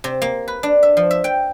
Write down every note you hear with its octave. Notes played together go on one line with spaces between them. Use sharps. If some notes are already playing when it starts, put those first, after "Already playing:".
C3
A#3
B4
D4
E5
F3
E5
G5